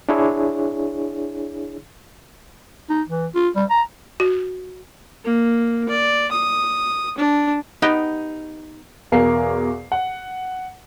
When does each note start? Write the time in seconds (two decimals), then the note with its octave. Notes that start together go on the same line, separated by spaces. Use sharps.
0.09 D4 E4 G#4 C#5
2.90 D#4
3.09 E3
3.35 F4
3.56 G3
3.70 A#5
4.20 F#4
5.25 A#3
5.89 D5
6.31 D#6
7.18 D4
7.82 B3 D#4 G4 D#5
9.12 E2 B2 A#4 F5 G#5 C7
9.92 F#5